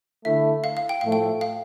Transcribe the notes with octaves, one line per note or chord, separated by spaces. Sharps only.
D3 A3 E4 A4 E5
F5
F5
G5
A2 F3 A3 F5
G5
F5